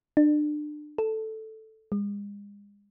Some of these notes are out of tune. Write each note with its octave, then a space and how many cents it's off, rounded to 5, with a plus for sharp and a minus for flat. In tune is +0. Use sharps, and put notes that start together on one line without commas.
D4 +30
A4 +0
G#3 -40